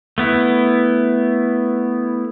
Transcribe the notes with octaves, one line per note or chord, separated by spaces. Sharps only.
A3 B3 E4